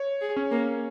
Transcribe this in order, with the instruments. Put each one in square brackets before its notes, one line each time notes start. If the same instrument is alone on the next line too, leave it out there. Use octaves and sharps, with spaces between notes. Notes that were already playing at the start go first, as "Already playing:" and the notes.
Already playing: [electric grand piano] C#5
[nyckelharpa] G#4
[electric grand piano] C#4
[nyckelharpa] A#3